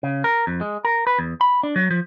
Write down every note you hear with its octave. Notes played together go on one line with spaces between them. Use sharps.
C#3
A#4
F2
G#3
A#4
B4
E2
B5
D4
F#3
F3